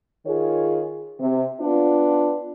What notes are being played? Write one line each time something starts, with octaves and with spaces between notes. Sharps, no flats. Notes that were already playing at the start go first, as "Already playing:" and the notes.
D#3 F4 G#4 C#5
C3
B3 D4 F4